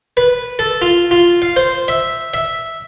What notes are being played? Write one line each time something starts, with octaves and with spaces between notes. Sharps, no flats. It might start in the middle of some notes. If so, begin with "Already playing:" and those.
B4
A4
F4
F4
F5
C5
E5
E5